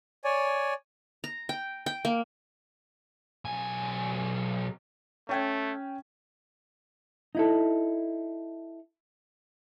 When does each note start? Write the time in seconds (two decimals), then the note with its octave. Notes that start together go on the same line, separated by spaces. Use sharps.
0.24 C#5 D5 G#5
1.24 A#5
1.49 G5
1.86 G5
2.05 A#3
3.45 B1 G#5
5.29 A3 C#4 G5 G#6
7.35 D#4 E4 A4